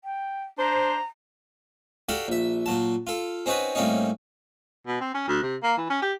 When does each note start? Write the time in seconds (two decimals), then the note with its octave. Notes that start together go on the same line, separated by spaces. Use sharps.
0.04 G5
0.59 D4 C5 A#5
2.09 F#4 G4 A4 D5 F5
2.28 A#1 E5
2.66 A#2 F#3 A5
3.07 F4 A4
3.46 C4 C#4 D#4 F#4 B4 C#5
3.75 A2 G3 A#3 C4 C#4 D#4
4.87 B2
5.01 C4
5.14 C#4
5.28 D2
5.42 C3
5.63 A#3
5.78 E3
5.90 C#4
6.02 G4